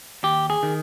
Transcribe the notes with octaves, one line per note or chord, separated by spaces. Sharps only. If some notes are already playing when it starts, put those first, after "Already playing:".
D#2 G4
G#4
D#3